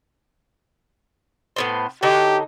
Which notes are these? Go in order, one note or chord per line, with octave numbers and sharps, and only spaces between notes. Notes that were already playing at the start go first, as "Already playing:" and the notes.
A2 B3 C5
D3 F#3 D#4 G4